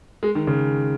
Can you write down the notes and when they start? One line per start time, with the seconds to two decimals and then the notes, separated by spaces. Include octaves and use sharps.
0.23 G#3
0.35 D#3
0.47 C#3